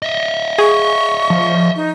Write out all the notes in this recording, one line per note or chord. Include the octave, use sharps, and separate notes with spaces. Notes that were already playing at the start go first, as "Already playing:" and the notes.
D#5 E5
G#4 C#6
F3
D#4